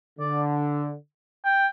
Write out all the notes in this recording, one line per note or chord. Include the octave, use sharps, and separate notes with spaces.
D3 D5
G5